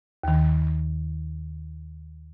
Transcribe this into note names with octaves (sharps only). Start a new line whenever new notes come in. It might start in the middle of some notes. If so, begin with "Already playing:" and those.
D#2 D#3